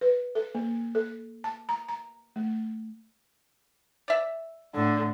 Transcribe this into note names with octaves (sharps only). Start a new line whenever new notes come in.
B4
A4
A#3
A4
A5
A#5
A#5
A3
D5 E5
A2 D3